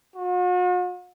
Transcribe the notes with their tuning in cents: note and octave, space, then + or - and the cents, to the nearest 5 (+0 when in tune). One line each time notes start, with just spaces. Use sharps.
F#4 -45